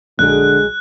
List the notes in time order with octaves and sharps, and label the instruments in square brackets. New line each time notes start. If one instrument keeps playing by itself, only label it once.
[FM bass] A#1 [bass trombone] D3 [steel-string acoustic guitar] F#3 G#3 G#4 [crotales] F#6